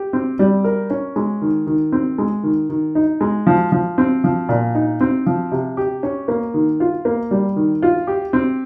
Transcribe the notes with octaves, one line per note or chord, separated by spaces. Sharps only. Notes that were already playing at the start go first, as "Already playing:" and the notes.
Already playing: G4
C4
G3
A#4
C#4
G#3
D#3
D#3
C4
G#3
D#3
D#3
D#4
G#3
F3
F3
C4
F3
A#2
D#4
C4
F3
C3
G4
C#4
A#3
D#3
F4
A#3
G3
D#3
F4
G4
C4